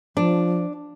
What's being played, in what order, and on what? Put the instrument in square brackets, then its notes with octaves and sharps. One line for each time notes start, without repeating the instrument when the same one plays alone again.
[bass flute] F3 [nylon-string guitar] D4